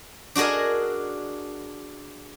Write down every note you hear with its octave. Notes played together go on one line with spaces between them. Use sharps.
D4 F#4 G#4 A#4 D#5